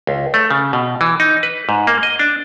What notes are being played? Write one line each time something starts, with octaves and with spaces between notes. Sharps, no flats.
C#2
A3
C#3
B2
E3
D#4
B4
G#2
A#3
D#5
D4